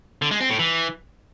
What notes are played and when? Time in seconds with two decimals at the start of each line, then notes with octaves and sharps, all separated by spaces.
0.22 D3
0.31 G#3
0.40 C4
0.50 A2
0.59 E3